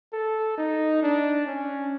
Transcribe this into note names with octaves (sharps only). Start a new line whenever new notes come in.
A4
D#4
D4
C#4